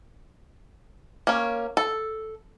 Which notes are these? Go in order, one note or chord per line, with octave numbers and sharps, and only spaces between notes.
A#3 C#4
A4